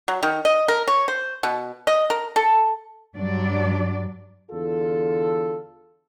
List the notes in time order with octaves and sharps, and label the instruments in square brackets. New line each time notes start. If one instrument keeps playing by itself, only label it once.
[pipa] F#3
D#3
D#5
A#4
C#5
C5
B2
D#5
A#4
A4
[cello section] G2 F#3 D4 D5
[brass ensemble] E2 D3 F4 A4